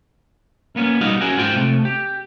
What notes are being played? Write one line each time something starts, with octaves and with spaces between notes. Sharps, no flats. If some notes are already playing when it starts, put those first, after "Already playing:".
A#3 B3 C#4
B1 G3 D#4 F#4 F5
C#4 E4 F#4 G#4 A#4
G#2 F4 C5 G5
C3 A3
G4